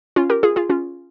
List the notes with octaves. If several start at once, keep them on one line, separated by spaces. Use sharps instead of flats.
C#4 F4
G4 A#4
F4 G#4
F4 G#4
C#4 F4